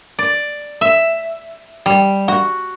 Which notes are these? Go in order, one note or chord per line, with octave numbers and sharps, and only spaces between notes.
D5
E5
G3
F#4